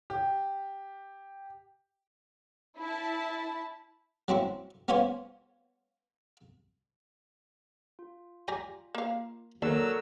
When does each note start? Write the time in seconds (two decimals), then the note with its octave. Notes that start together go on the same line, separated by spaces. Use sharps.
0.10 G4
2.78 E4 A5
4.28 F#3 C4 C#4 E4
4.88 B3 C#4 F4 C5 C#5 G#5
7.99 F4
8.48 G4 D5 G#5 A#5
8.95 A#3 F5
9.62 D#2 F#3 A4 A#4 D5 A5 E6